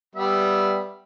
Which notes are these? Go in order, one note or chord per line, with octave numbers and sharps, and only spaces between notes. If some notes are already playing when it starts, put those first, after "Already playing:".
G3 B3 E5